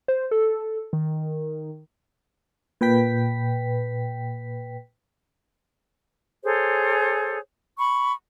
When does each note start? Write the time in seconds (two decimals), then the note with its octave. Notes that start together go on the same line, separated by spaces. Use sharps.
0.08 C5
0.31 A4
0.93 D#3
2.81 A#2 B4 G5 B6
6.43 G#4 A4 C5 C#5
7.79 B5 C#6